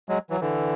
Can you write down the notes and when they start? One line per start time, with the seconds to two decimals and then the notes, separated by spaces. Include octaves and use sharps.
0.09 F#3 G#3
0.30 E3 F#3
0.41 D3 E3